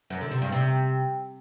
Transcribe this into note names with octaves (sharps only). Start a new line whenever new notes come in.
F#2
D3
C3
G2
C3